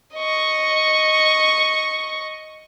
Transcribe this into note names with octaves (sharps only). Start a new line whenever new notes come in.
D#5 C#6